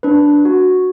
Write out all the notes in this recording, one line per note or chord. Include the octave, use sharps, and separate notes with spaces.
D4 B4
F#4